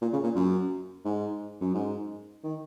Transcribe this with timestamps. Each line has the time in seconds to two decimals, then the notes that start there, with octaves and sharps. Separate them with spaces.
0.02 A#2
0.13 C#3
0.23 A#2
0.35 F#2
1.05 G#2
1.61 F#2
1.74 G#2
2.44 D#3